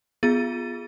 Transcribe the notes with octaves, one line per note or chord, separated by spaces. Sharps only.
B3 F4 G#4 A6 D#7